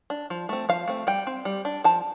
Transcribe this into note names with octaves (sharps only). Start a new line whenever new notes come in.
D4
F3
A3 C4
F3 F5
A3 C4
G3 G5
C4
G3
D4
F3 A5